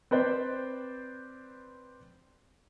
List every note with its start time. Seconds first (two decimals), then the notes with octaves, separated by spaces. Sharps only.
0.11 C4 B4 C5 D5